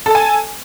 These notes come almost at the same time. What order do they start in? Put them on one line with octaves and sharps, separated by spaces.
A4 A5 G#5